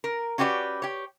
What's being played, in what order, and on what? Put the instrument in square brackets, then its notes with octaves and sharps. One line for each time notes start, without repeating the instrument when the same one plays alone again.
[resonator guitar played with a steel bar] A#4
C#4 F#4 G4 B4 C5 D5
G4 C#5